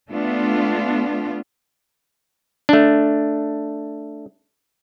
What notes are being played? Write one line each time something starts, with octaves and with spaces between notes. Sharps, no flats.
A3 B3 D4 F4
A3 D4